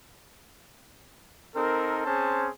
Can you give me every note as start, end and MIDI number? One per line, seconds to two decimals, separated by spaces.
1.55 2.03 60
1.55 2.03 63
1.55 2.03 69
1.55 2.03 70
2.06 2.48 60
2.06 2.48 61
2.06 2.48 68
2.06 2.48 72
2.06 2.48 81